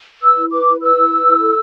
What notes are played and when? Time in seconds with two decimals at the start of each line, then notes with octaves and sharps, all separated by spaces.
0.22 B4 E6
0.37 E4
0.52 B4 D6
0.67 E4
0.81 B4 E6
0.96 E4
1.11 B4
1.25 E4
1.41 A4